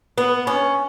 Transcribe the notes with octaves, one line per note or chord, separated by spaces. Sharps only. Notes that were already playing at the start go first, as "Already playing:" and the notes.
B3
C#4